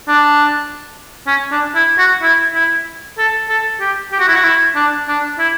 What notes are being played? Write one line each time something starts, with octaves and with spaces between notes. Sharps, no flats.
D4
C#4
D4
E4
F#4
E4
E4
A4
A4
G4
G4
F#4
E4
F#4
E4
D4
D4
E4